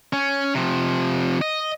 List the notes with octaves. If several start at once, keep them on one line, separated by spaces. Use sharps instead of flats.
C#4
C3 F3
D#5